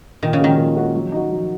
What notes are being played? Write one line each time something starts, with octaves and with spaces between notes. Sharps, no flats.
A#2 D#3
C#3
D#3 G#3 C#4 F#4
A#2
G#3 C#4 F#4
F#3
D#4 F#4
F#3